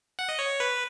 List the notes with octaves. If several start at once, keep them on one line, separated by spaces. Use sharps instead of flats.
F#5
D#5
C#5
B4